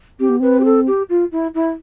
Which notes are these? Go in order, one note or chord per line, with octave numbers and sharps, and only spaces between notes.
C4 G4
B3
C4 B4
G4
A4
G4
F4
E4
E4